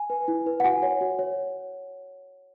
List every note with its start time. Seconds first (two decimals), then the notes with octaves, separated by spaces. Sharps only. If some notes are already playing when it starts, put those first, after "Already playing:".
Already playing: G#5
0.10 B4
0.28 E4
0.46 B4
0.60 F#5
0.64 F#4 G#5
0.83 C#5
1.01 F#4
1.19 C#5